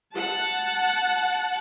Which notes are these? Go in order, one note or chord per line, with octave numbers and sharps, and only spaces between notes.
F#5 A5